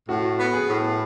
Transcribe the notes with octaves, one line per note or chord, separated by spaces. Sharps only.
A2 F#4
B3
G#4
A2